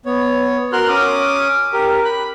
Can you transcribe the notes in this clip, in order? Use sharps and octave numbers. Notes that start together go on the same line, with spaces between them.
B3 C#5
F#4 A#4 C6 F6 F#6
C#4 D6 D#6
G4 A#4
B5 F#6